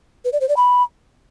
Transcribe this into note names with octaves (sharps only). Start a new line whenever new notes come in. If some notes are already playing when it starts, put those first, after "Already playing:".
B4
D5
C5
D5
B5